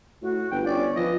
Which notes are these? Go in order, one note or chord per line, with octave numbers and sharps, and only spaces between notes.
A2 F#4
G1 B4 G5
C#4 D5
F3 B4 D#5